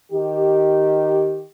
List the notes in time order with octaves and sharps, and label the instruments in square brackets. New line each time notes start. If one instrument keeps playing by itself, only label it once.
[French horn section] D#3 G4